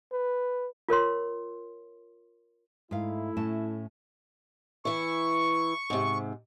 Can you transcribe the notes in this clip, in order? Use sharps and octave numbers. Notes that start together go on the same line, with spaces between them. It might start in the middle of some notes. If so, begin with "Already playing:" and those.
B4
F4 A#4 C#5 C6
G#2 A3 E4 F5
A2 C#4 A5
E3 E4 C#6
G#2 C3